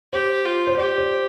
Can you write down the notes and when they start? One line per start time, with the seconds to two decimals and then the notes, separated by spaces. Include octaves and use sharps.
0.13 G4 C5
0.45 F4
0.67 C5
0.77 G4 D5
0.98 C5